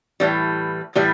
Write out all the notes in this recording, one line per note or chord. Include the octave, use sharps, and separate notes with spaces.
A2 E3 G3
A2 E3 G3